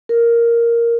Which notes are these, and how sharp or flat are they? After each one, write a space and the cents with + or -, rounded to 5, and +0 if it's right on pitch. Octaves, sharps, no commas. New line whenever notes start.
A#4 +0